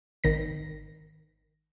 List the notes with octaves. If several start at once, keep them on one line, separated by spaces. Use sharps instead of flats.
G#1 D#3 A#6